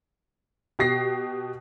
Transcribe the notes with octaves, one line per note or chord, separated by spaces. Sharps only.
B2 G4 A#6 C7